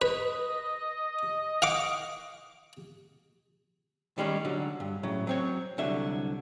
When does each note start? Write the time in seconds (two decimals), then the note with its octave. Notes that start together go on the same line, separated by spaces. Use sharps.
0.02 B4 D#5
1.62 F5 F#5 D6
4.18 D#3 G3 G#3 C#4
4.45 D3 F#3
4.80 G2
5.03 A2 C#3 F#3
5.27 F#3 C4 C#5
5.78 C2 D3 F#3 E5